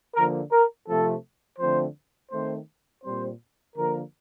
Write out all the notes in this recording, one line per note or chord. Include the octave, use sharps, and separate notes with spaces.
D3 F3 A#3 A#4
A#4
C3 F3 A3 C4 A4
D3 F3 A3 C4 C5
D#3 A3 C4 C5
A#2 G3 C4 C5
D3 F3 A#3 A#4